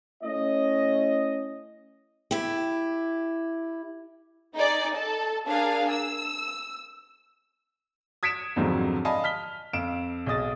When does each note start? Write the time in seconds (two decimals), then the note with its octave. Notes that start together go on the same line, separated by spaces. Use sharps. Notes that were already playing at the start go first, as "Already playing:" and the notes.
0.24 A3 C#4 E4 D#5
2.31 E4 G4
4.55 D#4 G#4 D5
4.95 A4 A5
5.48 D4 G#4 A#4 F5
5.91 E6
8.23 D#6 G#6 B6 C#7 D7 E7
8.56 F2 G#2 D3 D#3 F3 F#3
9.05 D5 D#5 F5 G#5 A5 B5
9.24 F6 B6 G7
9.73 F2 F5 D7 E7
10.26 B1 G#4 D#5 D#6 A6